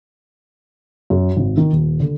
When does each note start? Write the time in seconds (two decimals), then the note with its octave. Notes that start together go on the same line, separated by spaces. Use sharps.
1.10 F#2
1.37 G#1
1.57 D#3
1.73 D#1
2.00 D3